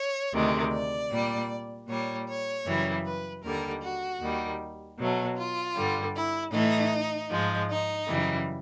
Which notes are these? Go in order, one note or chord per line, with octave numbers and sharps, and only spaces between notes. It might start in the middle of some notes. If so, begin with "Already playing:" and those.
Already playing: C#5
D2 C3 D#3 G#3
D5
A#2 G3
A#2 G3 C#5
C#5
F#2 C#3 E3 G3
B4
D#2 D3 G3 A#4
F#4
D#2 D#3 G3
B2 F#3 A3
F4
G2 D3 G3
E4
A2 E3 A3 D#4
G#2 F3 G#3
D#4
F#2 C#3 E3 G3